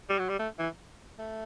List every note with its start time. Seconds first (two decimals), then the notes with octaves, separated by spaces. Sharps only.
0.09 G3
0.19 F#3
0.29 G3
0.39 A3
0.59 E3
1.19 A3